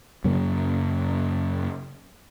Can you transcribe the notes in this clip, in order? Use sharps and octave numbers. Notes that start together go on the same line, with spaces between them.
F#2 C#3 F#3 A#3